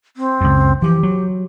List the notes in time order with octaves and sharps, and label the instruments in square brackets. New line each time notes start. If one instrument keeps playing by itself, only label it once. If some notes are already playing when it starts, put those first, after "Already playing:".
[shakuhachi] C4
[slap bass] C#2 F#2
[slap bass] E3 F3 [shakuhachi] G4
[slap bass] F#3